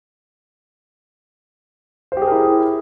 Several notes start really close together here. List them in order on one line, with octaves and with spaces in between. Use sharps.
C5 G4 G#4 A#4 E4